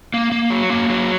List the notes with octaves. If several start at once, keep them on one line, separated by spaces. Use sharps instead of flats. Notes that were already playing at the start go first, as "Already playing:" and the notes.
A#3
A#3
F#3
A#3
F#3